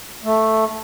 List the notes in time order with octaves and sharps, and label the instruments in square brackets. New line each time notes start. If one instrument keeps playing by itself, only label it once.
[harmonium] A3